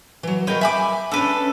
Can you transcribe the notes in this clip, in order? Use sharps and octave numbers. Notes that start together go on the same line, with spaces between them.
E3 F#3
F#3 A#4 B4 D#5 G5
E5 G#5 B5 D6
C#4 D4 A4 B4